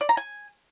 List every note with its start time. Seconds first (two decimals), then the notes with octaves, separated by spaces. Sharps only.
0.01 D5
0.09 A#5
0.17 G#5